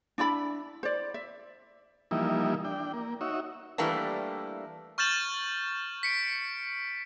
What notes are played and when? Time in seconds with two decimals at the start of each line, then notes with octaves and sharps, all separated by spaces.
0.18 D4 E4 D5 B5
0.83 C5 D5
1.14 E5
2.11 E3 F3 G3 A#3 D#4 E4
2.65 D4 G5
2.94 A#3
3.21 D#4 F#4 C#5 E5
3.78 E3 G3 A3 A#3 D4
4.98 C#6 F6 G6 A6 E7 F#7
6.03 B6 C#7 D7